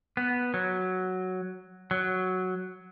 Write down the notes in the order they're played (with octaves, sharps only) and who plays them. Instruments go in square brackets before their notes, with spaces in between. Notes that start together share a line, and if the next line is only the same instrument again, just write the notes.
[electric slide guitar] B3
F#3
F#3